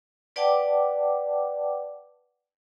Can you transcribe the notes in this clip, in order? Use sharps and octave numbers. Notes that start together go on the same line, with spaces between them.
B4 D5 F#5 G5 A5 D6